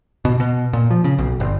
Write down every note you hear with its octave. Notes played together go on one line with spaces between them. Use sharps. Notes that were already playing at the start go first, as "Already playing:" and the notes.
B2
B2
A#2
F3
C#3
B1
G1